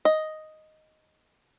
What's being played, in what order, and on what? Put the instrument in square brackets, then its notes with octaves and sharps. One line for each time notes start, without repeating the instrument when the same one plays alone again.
[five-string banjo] D#5